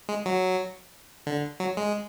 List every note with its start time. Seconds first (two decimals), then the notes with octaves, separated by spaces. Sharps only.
0.09 G#3
0.26 F#3
1.27 D3
1.60 F#3
1.77 G#3